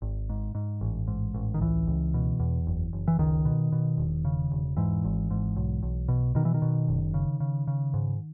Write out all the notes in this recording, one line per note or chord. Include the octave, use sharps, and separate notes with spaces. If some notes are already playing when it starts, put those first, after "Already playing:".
G#1
G#2
G#2
A1
G#2
A1
D#3
C#2 E3
C#2
B2
E2
F#1
F#1
E3
C#2 D#3
B2
B2
E1
C#3
E1
G#2 E3
G#1
G#2
B1
B1
B2
B2 D#3
E3
D#3
B2
F#1
C#3
C#3
C#3
G#2